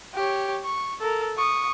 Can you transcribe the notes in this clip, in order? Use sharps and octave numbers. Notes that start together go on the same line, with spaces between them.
G4 C#5
C#6
A4 A#4
C#6 D#6